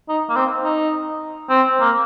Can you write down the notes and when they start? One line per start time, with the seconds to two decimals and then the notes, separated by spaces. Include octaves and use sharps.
0.08 D#4
0.29 A#3
0.36 C4
0.64 D#4
1.49 C4
1.80 A#3